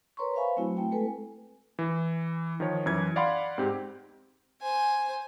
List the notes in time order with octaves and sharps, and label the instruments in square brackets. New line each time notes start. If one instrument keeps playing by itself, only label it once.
[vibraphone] A#4 B4 C#5 A#5 C6 C#6
B4 C5 E5 F5 G#5 B5
F#3 A3 C4 E4 F#4
A3 C4 E4 G5
G#3 A3 A4 B4 G#5
[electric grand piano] E3
D#3 F3 C#5
F#2 E3 G#6
D5 F5 F#5 B5 C6
G#2 C4 G4
[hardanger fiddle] C5 G#5